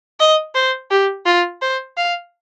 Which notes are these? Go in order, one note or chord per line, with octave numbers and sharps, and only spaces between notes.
D#5
C5
G4
F4
C5
F5